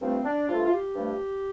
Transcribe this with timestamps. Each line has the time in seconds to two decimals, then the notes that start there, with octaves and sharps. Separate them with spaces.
0.01 G2 F3 A3 C4
0.24 D4
0.48 G2 F3 A3 F4
0.66 F4
0.72 G4
0.95 G2 F3 A3